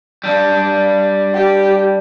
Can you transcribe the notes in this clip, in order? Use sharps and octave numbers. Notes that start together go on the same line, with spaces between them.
G3 D4
G4